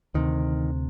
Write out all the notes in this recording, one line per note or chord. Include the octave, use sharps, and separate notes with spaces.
D2 C3 D#3